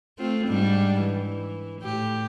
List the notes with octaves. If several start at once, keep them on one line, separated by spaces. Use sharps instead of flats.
A3 C4 F4
G#2 G3 D4
E3
A2 G4